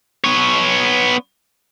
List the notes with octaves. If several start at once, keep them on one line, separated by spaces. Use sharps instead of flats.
B3 C#5